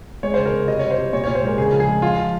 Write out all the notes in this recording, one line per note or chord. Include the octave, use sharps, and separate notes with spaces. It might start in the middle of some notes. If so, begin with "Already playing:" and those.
G#3 C#5
C#3 C5
A#4
C#3
C3 D#5
G3 C#5
C5
C3
A#2 C#5
A#2 C#5
C5
G#3 A#4
C#3 G#4
F3
G#4
G#3
F3 F4
F3